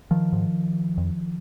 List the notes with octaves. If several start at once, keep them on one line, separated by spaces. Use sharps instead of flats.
D#3 F3
G#2
F2